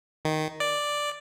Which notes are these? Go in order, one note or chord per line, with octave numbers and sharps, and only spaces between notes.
D#3
D5